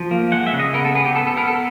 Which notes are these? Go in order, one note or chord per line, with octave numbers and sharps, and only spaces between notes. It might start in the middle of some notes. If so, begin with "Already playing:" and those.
Already playing: F3
A#3
G#3 F#5
E5
C#3
D#5
B3 A#4
A4
B3 G#4
G4
B3 A4
A4
B3 A#4
A4